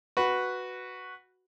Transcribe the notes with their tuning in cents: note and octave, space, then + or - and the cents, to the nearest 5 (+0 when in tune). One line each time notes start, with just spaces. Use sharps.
F#4 +0 B4 +0